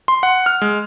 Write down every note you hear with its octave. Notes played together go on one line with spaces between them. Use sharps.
C6
F#5
F6
G#3